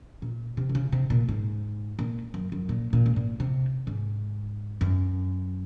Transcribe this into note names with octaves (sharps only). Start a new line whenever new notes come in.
A#2
C3
D#3
C#3
C3
A#2
G#2
A#2
F#2
F#2
A#2
A#2
G#2
A#2
C3
G#2
F#2